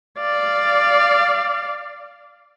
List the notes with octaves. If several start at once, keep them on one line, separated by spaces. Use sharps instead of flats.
D5 F5